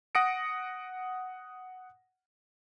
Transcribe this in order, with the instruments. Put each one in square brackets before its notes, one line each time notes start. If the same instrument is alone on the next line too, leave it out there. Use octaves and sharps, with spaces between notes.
[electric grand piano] F#5 D#6 A#6 C#7 D7